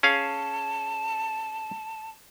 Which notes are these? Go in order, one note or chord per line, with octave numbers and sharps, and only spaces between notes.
C#4 G#4 F5 A5